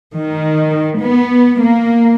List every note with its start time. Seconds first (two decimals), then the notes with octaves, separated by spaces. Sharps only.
0.15 D#3
1.02 B3
1.62 A#3